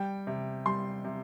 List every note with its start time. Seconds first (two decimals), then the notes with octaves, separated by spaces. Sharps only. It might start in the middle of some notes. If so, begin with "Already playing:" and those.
Already playing: G3 G5
0.27 C3
0.66 G3 C6
1.05 C3